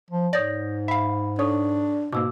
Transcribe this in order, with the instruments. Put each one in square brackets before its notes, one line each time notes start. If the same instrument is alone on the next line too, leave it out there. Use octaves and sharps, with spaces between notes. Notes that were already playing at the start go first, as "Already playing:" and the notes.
[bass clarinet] F3
[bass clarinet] G#2 [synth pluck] C#5 D5 [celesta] D#6 G6 A#6
[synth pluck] E5 F5 [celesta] B5
[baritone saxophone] D4 [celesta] A4 C#6 D#6 [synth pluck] C#5
[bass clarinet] G#2 [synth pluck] B2 A#3 [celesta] D6 E6